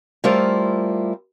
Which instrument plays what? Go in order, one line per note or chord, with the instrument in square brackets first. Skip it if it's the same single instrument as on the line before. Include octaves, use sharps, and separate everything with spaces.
[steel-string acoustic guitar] G3 A3 E4 F4 A#4 C5